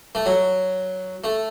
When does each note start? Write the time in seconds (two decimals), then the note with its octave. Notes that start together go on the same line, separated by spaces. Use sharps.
0.15 A3
0.26 F#3
1.24 A3